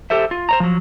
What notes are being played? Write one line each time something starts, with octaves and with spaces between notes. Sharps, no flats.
G4 A4 C5 E5
F4
C5 C#5 A#5
F3 F#3